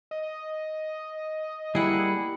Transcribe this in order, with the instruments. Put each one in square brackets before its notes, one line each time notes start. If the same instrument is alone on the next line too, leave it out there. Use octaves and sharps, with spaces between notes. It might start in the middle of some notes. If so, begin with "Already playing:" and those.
[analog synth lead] D#5
[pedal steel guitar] G3 A#3 G#4 [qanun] E4 F#5